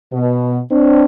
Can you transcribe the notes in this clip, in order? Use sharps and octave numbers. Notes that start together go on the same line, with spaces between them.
B2
C4 D4